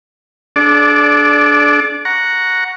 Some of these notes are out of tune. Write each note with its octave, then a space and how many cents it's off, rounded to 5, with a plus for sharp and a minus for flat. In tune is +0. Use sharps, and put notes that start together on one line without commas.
D4 -10 A4 -45 D5 +0
F#5 -5 A#5 +0 C#6 +0